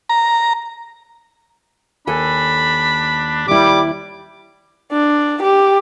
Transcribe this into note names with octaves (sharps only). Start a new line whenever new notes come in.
A#5
D#2 D4 A4 G#5 B5
D#2 G3 E4 D6
D4
G4